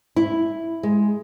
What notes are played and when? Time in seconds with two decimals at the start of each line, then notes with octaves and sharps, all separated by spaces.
0.16 E4
0.83 G#3